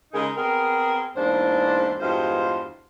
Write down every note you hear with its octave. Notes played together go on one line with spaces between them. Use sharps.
C#3 G#3 D#4 G#4 A#4
B3 C4 G#4 A#4
E2 G#2 A#3 D4 C5
E2 G2 G#3 F4 F#4 C5